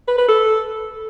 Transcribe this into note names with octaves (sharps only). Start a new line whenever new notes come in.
B4
B4
A4